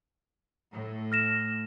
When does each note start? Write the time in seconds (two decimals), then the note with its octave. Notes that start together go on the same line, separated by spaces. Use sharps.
0.73 A2
1.12 F6 A#6 E7